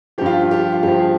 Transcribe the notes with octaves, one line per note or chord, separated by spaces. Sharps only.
G2 F3 F4 G4
F4
G4
F4
G2 F3 G4
G#4